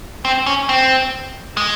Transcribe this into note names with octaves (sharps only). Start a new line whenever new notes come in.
C4
C#4
C4
G#3